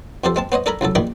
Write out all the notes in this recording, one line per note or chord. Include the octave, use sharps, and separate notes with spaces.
F2 C4 G4 A4 C5
G#3 C4 A5
B3 C5 C#5 D#5
D4 A4 A#4 G#5 A#5 B5
C2 C#3 F#3 A4
A#1 D#3 G#4 D5 G5 B5